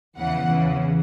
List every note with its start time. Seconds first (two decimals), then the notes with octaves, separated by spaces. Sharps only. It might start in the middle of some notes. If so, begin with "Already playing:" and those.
0.17 E2 C#3 E3 F#5
0.48 E2 C#3 E3